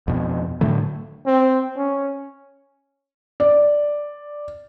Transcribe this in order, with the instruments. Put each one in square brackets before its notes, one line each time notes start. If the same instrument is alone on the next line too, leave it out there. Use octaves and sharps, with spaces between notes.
[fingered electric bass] F2 B2
A2 D3 F#3 A3
[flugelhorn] C4
C#4
[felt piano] D5